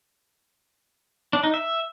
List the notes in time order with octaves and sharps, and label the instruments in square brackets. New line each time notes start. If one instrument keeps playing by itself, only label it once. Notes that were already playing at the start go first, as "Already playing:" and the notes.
[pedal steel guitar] D4
D#4
E5